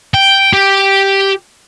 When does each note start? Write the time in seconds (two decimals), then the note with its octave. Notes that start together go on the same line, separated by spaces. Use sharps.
0.14 G5
0.53 G4